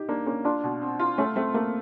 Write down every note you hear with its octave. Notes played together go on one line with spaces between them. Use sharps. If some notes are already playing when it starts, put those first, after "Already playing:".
Already playing: D#4 G4
A#3 D4
A#3 C#4
D4 F4
B2
C4
F4
A3 C#4
A3 C4
A3 A#3